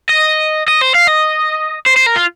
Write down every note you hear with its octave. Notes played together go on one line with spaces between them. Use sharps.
D#5
D#5
C5
F5
D#5
C5
C5
A#4
F4